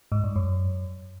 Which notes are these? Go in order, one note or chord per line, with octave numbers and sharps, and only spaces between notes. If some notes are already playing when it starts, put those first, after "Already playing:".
G#2
G2
F#2